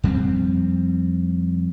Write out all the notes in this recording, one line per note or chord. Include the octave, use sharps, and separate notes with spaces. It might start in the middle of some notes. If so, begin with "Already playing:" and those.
F2 G3 B3 C4